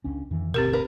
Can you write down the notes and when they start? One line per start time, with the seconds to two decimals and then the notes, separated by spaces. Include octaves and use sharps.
0.04 C#2 C#4 D4
0.31 F2 D#3 E3
0.54 G1 D2 B2 C4 G4 A#4
0.73 A#4 B4